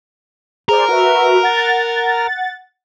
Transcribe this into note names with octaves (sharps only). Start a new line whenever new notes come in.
G#4 A#4 C5 D5
F#4 B4 E5
F#5 A6